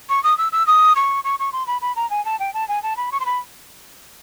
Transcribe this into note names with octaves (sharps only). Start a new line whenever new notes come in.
C#6
D#6
E6
E6
D#6
C#6
C#6
C#6
C6
B5
B5
A#5
G#5
A5
G5
A5
G#5
A5
B5
C#6
C6
B5